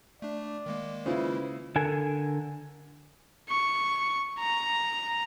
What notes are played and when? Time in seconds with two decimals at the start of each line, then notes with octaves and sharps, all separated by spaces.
0.22 A3 D4 D5
0.66 D#3 G#3 A#3
1.06 C#3 E4 F4 B4 C5
1.76 D3 A4 A#4 G#5
3.49 C#6
4.39 A#5